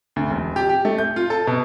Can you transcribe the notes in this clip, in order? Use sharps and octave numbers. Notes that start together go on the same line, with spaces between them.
D2
E1
G4
G4
A3
G6
F4
A4
B2